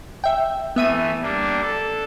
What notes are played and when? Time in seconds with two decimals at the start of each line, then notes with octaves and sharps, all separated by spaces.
0.24 E5 G5
0.76 E3 A3 B3 E5 D#7
1.22 G3 A#3 D4
1.62 A4